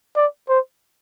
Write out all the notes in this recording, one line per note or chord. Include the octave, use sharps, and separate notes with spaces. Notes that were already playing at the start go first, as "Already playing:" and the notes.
D5
C5